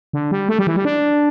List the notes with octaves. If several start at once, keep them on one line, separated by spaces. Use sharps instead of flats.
D3
G3
A3
G3
E3
G3
D4